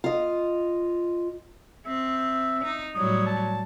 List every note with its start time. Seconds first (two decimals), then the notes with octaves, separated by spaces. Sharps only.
0.04 F4 D#5
1.86 C4 E5
2.64 D#4
2.95 A2 F#3 G3 D#6
3.26 A5